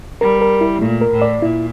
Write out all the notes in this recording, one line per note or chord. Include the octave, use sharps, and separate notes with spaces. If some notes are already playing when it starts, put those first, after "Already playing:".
G3 A#4
A#4
E4
A#2 A3
A#4
A2
D5
A#2 E4